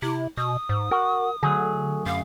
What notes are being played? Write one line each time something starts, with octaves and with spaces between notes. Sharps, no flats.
C3 E4
B2 D#6
G#2
F#4 A#4
D2 D3 F#3 G#4
F#2 F5